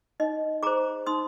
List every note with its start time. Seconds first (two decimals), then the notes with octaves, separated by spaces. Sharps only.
0.20 D#4 D#5
0.63 G#4 C5 A#5 D6
1.07 D#4 C6 D#6